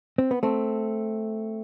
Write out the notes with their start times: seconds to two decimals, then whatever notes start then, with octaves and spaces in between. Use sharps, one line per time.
0.18 C4
0.31 B3
0.43 A3 C4